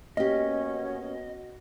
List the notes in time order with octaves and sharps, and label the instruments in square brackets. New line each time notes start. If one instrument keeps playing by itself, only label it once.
[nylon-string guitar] A#3 G4 [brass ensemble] B3 F#4 [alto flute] C#4 [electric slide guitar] D#5